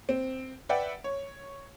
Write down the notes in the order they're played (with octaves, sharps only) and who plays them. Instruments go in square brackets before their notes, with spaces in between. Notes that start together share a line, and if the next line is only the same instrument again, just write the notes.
[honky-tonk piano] C4
B4 D5 E5 F#5 G5
C#5